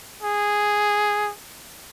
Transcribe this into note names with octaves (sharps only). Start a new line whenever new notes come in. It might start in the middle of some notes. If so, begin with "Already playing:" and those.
G#4